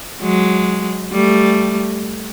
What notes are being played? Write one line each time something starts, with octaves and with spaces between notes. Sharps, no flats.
F#3 G#3
G3 A3